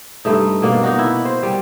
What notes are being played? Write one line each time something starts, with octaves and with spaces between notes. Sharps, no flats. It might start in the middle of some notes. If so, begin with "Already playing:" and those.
G2 A3 D#4
B2 A#3 D4
D#4 F#4
E4
C5
G3